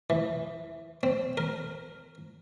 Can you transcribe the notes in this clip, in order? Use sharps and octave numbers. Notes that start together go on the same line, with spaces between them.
E3
C4
A#4